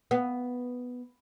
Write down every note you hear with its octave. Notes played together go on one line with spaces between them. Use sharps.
B3